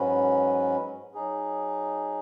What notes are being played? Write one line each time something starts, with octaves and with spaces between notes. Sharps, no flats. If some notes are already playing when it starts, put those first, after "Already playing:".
Already playing: G#2 F#3 C#4 B4
F#3 D#4 G#4